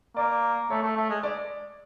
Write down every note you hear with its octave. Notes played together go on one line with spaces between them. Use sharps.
A#3 D5
A3 C#5
A3
A3
G#3
D5